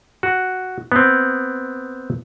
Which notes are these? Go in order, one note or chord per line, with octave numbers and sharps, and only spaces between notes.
F#4
B3 C4